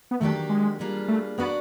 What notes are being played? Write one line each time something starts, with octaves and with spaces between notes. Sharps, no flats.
B3
D#3 F#3 A3 A#3 D4 G4
G#3
G3 A#3 D4 F4 G#4
A3
A#3 B3 D4 F#4 B4 D5